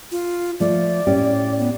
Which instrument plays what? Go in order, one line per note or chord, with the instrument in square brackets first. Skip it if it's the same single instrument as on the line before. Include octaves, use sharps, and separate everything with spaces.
[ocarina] F4
[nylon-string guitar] F3 A3 [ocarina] D5
[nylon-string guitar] A2 C#4 G4
[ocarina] B3